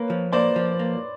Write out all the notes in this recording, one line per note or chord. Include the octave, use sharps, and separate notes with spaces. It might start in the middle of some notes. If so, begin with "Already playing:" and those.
Already playing: A#3 B4 C#5
F3
A#3 C5 D5
F3
A#3